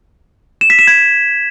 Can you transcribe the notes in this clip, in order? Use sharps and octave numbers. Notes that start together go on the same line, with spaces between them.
E7
B6
E7
G#6